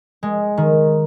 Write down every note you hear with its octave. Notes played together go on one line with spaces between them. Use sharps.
G#3
D#3